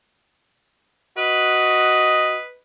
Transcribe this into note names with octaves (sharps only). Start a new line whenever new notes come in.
F#4 B4 D#5